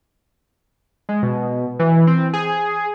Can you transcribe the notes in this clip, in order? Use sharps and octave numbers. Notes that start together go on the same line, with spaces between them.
G#3
B2
E3
C4
G#4